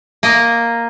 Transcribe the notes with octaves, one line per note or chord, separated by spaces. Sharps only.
A#3 D#5